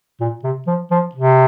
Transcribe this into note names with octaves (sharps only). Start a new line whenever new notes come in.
A#2
C3
F3
F3
C3